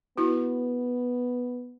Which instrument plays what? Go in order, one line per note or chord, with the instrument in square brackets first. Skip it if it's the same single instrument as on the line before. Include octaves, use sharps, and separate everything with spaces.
[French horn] B3 [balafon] E4 F#4